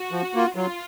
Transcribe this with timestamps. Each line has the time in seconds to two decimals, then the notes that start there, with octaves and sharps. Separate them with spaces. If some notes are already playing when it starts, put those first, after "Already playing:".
Already playing: F#4
0.12 F3
0.34 A#3 F4
0.56 F#3 F4